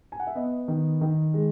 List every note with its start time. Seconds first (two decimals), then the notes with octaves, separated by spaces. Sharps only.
0.12 G#5
0.20 F#5
0.27 E5
0.35 B3 D#5
0.68 D#3
1.01 D#3
1.34 G#3